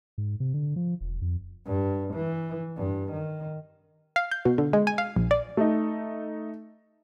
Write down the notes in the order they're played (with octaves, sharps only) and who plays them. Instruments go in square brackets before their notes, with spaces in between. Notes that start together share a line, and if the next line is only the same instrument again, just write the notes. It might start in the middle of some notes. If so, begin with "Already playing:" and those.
[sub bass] G#2
C3
D3
F3
E1
F2
[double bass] G2
E3
G2
D#3
[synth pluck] F5
G6
B2
D3
G#3
G#5
F5
A#1
D5
[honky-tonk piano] A3 D#4